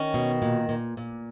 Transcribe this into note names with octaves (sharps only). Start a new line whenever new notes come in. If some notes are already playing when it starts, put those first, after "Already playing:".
Already playing: D#3 C#4
B2
A#2
A#2
A#2